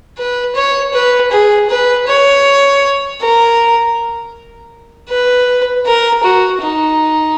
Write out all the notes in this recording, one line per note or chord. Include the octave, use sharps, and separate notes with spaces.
B4
C#5
B4
G#4
B4
C#5
A#4
B4
A#4
F#4
D#4